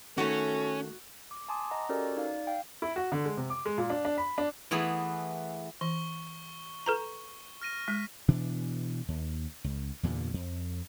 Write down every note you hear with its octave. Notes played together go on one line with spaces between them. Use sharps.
D#3 A3 C#4 F#4 A4
D6
G#5 A5 C6 D6 D#6
D#5 F#5 A#5
C#4 F#4 G4 A4 A#4 D5
D#4 D5 F5
F5 G5
E4
F#4
D3
G#3
C3
D6
G#3
A#2
D4
D4
B5
D4
E3 A3 B3 G#4
E3 C#6 G7
A4 B4 A#5
F6 A#6 D#7
G#3 B6
B2 E3 D4
D#2
C#2
E2 G2 A#2 D3
F2